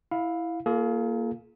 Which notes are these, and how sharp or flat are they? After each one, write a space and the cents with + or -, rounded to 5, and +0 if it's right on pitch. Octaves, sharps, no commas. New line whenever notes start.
E4 +0 F5 +20
A#3 +0 F4 -15 G#4 +45